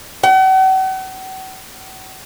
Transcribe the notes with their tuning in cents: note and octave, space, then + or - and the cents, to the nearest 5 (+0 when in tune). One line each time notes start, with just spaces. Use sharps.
F#5 +45